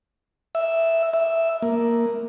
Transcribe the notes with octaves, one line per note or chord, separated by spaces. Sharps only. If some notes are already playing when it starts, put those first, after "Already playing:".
E5
E5
A#3